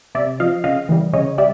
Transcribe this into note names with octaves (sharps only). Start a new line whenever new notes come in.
C3 D5 E5
F3 D#5 F5
C#3 D#5 F5
E3 G3
C#3 C#5 D#5
G3 D5 E5